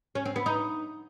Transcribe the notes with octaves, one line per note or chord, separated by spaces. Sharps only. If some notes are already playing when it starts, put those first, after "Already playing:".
C#4
C4
B3
D#4